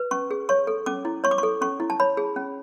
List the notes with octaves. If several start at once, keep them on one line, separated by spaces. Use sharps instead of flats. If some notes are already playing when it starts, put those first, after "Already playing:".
Already playing: B4
C#4 C#6
G#4
C#5 C#6
A4
C#4 D6
E4
C#5 C#6
D6
A4 C#6
C#4 C#6
E4
A5
C#5 B5
G#4
C#4